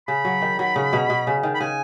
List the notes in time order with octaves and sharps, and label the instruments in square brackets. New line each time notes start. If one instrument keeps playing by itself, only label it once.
[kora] C#3 [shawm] B5
[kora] F#3
D#3
F#3
C#3
B2
B2
C#3
D#3
[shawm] B5
[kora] C#3 [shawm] G#5